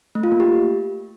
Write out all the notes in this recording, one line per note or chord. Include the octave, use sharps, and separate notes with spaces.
A3
F4
A#3
G4